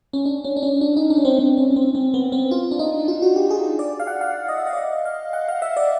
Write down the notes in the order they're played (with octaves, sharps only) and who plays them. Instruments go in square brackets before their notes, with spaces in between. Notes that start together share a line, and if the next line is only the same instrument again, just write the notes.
[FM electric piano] C#4
D4
C#4
D4
C#4
D4
D#4
D4
C#4
C4
C4
C#4
C#4
C4
C4
B3
C4
F4
D4
D#4
F4
F#4
G4
G#4
D5
F5
F#5
F5
D#5
E5
D#5
D5
D#5
F5
F#5
F5
E5
D5